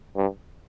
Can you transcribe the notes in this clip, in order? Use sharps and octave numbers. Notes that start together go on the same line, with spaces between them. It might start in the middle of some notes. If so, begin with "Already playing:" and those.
G2